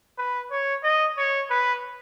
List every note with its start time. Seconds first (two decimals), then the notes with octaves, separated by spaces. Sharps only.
0.18 B4
0.51 C#5
0.83 D#5
1.17 C#5
1.50 B4